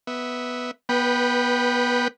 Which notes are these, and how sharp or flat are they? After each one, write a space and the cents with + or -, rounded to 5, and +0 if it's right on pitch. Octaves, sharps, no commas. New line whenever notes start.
B3 +0 E5 -15
B3 -25 B4 +0 G5 +0